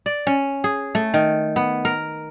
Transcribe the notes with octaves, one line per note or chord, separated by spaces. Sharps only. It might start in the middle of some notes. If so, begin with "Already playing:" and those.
D5
C#4
G#4
A3
D#3
B3
A#4